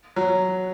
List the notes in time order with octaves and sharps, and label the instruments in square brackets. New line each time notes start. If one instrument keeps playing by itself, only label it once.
[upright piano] F#3